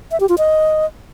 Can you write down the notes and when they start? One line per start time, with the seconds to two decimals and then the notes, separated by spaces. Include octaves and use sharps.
0.11 E5
0.20 G4
0.29 F4
0.38 D#5